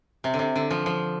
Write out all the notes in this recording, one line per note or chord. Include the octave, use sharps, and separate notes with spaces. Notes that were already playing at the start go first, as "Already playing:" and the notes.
C3
D3
C3
D3
F3
F3